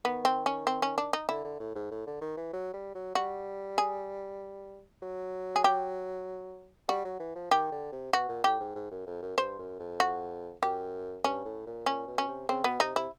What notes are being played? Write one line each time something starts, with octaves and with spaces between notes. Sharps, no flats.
D#3 B3
C4
C#4
C4
C#4
D4
D#4
D3 E4
D3
A2
G#2
A2
D3
D#3
E3
F#3
G3
F#3
G3 F#4
G#4
F#3
G#4
G4
G3 F#4
F#3
E3
F3
D#3 G4
D3
C3
B2 F#4
A#2
A2 G4
G#2
G#2
F#2
F2
F#2
G2 C5
F#2
F2
F#4
F#2 G4
G2 C#4
A2
A#2
A#2 C#4
B2
C#4
C3
C#3 C4
B2 B3
C3 D#4
C3 E4